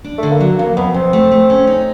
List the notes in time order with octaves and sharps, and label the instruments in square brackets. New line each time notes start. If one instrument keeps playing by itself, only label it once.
[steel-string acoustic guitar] D4
[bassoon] A3
[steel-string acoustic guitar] D3
[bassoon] A#3
[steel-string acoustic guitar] F#3
[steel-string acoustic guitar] F2 [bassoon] A#3
[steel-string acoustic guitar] F2 [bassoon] B3
[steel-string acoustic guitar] C3 [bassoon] C4
[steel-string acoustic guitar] A3
A3
C#4
D#4